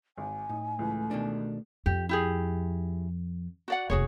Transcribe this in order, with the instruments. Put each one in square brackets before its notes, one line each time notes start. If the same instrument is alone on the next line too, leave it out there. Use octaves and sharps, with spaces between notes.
[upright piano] G#1 [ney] G#5
[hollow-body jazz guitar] A2 [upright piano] D#4
[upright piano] C#2 E3 [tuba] A3
[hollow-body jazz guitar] B2 D#3 D4
[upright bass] F2 [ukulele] G4
[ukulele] E4 G4 G#4
F#4 D5 F#5
[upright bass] F1 D#2 [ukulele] F#4 G#4 C#5